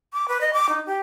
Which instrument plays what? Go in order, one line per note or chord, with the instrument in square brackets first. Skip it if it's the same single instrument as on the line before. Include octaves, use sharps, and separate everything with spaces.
[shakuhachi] D6
B4
D#5
D6
D#4
G4